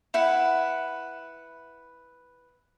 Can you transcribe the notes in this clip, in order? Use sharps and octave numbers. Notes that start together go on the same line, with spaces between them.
E4 B4 F#5